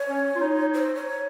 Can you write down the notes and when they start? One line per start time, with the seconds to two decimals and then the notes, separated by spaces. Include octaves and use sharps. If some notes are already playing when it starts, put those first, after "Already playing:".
Already playing: C#5
0.09 C#4
0.35 F4
0.41 D#4
0.74 C5
0.95 C#5